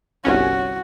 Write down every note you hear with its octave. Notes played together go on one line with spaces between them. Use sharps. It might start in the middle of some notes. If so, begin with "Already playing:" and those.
G1 C2 C#4 F#4